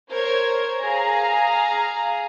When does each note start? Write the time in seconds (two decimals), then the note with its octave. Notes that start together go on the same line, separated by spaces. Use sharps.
0.10 A#4 C5 C#5 G#6
0.81 G#4 F5 A#5